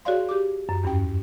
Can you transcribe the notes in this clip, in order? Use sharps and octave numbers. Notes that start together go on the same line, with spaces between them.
F#4 G#4 C#5 D5 F5 C6
G4 D6
F#2
E2 G2 C#4 G5